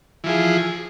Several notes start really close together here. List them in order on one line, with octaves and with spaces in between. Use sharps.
E3 F3 G#4